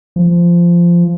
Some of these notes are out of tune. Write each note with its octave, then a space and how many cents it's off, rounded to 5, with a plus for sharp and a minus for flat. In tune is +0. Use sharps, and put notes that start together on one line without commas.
F3 -15